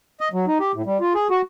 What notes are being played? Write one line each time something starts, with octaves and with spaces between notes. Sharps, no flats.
D#5
F#3
D#4
G4
A2
G3
F4
G#4
F#4